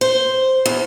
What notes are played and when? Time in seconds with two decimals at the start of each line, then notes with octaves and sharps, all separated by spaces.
0.01 C5
0.66 E2